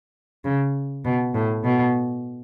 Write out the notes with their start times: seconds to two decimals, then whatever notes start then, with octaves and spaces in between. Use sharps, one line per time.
0.45 C#3
1.05 B2
1.34 A2
1.64 B2